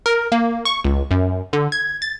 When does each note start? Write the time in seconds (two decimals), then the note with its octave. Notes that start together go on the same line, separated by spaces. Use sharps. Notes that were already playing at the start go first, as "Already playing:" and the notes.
0.06 A#4
0.32 A#3
0.65 C#6
0.84 C#2
1.11 F#2
1.53 D3
1.72 G#6
2.02 A6